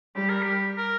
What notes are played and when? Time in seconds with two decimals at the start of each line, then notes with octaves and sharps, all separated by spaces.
0.15 G3 G4
0.29 A#4
0.42 G4
0.78 A#4